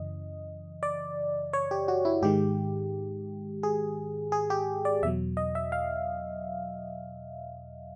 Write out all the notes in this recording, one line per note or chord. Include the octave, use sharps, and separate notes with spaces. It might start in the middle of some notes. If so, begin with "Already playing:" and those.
Already playing: F#2 C#3 E3 D#5
D5
C#5
G4
F#4
E4
G#2 D#3 G#3 G4
G#4
G#4
G4
D5
E2 B2 F#3 E5
D#5
E5
F5